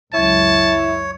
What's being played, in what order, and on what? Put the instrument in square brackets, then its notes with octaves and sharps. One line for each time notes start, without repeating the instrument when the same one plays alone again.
[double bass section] C#2 F#2 [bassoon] E4 [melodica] C#5 [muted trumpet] A5